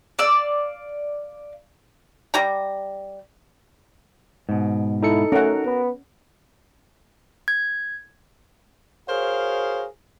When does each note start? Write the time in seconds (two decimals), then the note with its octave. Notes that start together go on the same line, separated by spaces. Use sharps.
0.19 D5 F5 E6
2.34 G3 G4 A#5
4.49 G#2 B2
5.03 D#4 E4 A4 C#7
5.32 A3 C#4 F#4 A#4 F#5
5.65 B3
7.48 G#6
9.09 F#4 G#4 A#4 C5 C#5 F5